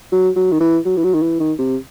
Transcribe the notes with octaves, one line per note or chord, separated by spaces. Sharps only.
F#3
F#3
D#3
E3
F#3
E3
F#3
D#3
E3
D#3
C3